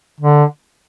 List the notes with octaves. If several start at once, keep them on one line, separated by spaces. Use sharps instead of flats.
D3